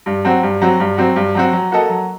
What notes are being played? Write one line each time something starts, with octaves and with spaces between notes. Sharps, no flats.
G2
F#3 C4 F#4
G2
F#3 C4 F#4
G2
F#3 C4 F#4
G2
F#3 C4 F#4
F#3
A#3 F#4 A4 D#5
F#3